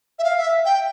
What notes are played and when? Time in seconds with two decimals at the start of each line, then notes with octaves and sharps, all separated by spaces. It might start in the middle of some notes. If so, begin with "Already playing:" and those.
0.19 E5
0.24 F5
0.38 E5
0.65 G5